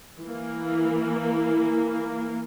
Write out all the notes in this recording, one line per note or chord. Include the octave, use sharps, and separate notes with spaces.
E3 A#3